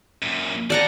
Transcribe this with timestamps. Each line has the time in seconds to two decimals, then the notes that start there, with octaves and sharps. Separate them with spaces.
0.22 F#2 A#2
0.70 C5 D5 F#5 A5 A#5